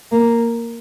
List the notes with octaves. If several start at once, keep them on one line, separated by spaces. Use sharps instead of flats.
A#3